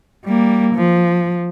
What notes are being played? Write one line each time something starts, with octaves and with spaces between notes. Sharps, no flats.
G3 A#3
F3